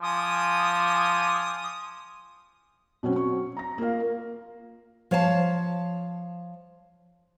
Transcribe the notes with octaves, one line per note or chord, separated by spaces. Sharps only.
F3 G#5 D6 D#6
B2 F#3 C4 C#4 F#4
C#6
A#5 A#6
A#3 F4 A#4 F5
F3 C#5 F5 A5